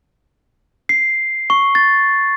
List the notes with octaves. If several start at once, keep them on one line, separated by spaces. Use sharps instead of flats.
C7
C#6
A6